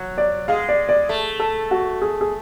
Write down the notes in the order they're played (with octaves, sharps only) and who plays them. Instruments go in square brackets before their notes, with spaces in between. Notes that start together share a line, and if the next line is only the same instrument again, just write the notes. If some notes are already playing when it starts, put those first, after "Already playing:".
Already playing: [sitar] F#3
[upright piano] D5
[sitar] G#3 [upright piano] F5
[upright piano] D5
D5
[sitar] A3
[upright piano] A4
F#4
G#4
G#4